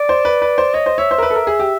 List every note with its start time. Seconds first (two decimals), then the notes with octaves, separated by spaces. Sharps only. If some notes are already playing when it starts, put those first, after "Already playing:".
Already playing: D5
0.09 C5
0.25 B4
0.42 B4
0.58 C5
0.74 C#5 D#5
0.86 C5
0.98 C#5 E5
1.11 C5
1.18 A#4
1.23 B4
1.30 A4
1.35 A#4
1.47 G#4
1.60 G4